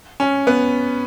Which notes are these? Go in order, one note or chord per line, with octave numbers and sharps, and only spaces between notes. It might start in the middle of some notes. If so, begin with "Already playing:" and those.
C#4
B3